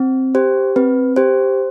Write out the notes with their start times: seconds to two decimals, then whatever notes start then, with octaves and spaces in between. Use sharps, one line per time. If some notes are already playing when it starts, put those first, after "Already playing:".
Already playing: C4
0.35 G4 C5
0.76 C4 B4
1.16 G4 C5